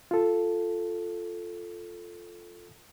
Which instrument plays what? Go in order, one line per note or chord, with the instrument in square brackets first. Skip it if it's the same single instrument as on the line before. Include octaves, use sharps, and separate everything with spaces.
[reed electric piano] F4 A4